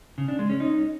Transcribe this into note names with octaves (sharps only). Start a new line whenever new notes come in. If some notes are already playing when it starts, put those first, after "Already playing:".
C#3
D4
G#3
C#4
D#4